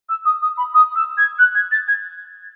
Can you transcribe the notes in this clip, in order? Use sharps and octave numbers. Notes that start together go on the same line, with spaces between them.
E6
D#6
D#6
B5
D#6
E6
G#6
F#6
G#6
A6
G#6